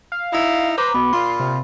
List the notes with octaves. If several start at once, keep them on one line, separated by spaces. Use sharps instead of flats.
F5
D#4 E4
B4 C5 A#5 D6
B2 B3 B5
A#2 F4 C6
C3